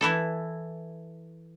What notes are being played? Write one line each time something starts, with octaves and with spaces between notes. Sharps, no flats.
E3 E4 A4